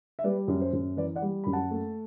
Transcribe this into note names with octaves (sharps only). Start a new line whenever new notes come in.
E5
G3 B4 D5
F#2
C5
F#2
E3 B4 D5
D5 F#5
G3
F#2 B5
F#5 A5
A3